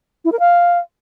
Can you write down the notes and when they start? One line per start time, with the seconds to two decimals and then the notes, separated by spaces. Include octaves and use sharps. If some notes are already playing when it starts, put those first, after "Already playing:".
0.25 E4
0.32 A#4
0.39 F5